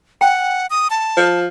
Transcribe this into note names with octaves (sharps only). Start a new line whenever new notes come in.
F#5 G5
D#6
A5
F3